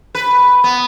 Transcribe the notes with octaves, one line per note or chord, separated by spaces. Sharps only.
B4
B3